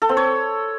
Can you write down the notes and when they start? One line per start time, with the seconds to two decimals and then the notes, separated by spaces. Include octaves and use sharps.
0.02 A4
0.09 C4
0.17 C#5